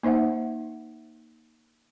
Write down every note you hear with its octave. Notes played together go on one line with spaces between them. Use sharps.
A#3 D#4 C5 E5 F#5